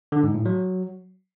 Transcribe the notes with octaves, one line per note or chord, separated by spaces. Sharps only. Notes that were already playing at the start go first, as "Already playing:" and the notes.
D3
G#2
A2
F#3